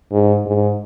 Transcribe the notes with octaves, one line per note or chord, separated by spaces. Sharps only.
G#2
G#2